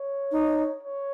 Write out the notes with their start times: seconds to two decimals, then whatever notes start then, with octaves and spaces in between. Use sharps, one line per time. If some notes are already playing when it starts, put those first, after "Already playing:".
Already playing: C#5
0.32 D#4
0.83 C#5